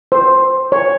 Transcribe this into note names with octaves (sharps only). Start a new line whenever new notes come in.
C5
C#5